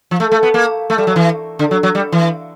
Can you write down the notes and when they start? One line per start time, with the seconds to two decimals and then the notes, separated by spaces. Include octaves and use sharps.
0.11 F3
0.20 A3
0.32 A3
0.43 B3
0.54 A#3
0.90 A3
0.98 G3
1.07 F#3
1.16 E3
1.59 D3
1.71 F#3
1.83 F#3
1.95 G3
2.12 E3